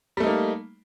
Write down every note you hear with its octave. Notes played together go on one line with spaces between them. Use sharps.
G3 A3 A#3 D#4